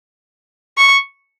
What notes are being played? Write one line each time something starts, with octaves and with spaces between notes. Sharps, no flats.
C#6